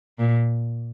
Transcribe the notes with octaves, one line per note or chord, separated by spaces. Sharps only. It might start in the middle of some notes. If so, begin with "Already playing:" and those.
A#2